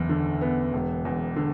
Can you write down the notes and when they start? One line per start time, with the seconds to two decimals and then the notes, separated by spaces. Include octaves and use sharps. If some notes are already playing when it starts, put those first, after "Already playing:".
Already playing: F#1 E2
0.09 D3
0.41 B3
0.73 E1
1.05 E2
1.36 D3